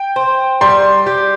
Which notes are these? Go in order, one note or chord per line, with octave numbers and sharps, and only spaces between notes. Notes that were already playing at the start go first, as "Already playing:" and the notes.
Already playing: G5
C5
G3 C6
G4